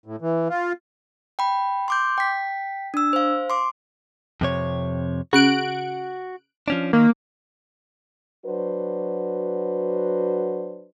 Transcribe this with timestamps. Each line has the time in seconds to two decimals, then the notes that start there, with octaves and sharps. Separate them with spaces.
0.06 A2
0.21 E3
0.49 F4
1.39 G5 B5
1.88 C6 D6 G6
2.18 G5 B6
2.94 D4 E6
3.13 C5 F5
3.50 C6 D6
4.41 F2 C3 C#5
5.33 C#3 F#4 F#6 D7
6.68 F3 C#4 D4
6.93 D#3 A#3
8.45 F#3 D4 F#4 B4 C5